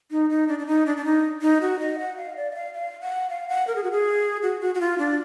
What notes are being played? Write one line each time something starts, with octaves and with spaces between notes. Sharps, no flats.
D#4
D#4
D4
D4
D#4
D4
D4
D#4
D#4
F#4
D#5
F#5
F5
D5
D#5
F5
F5
F#5
F5
F#5
A#4
G#4
F#4
G#4
F#4
F#4
F#4
F4
D4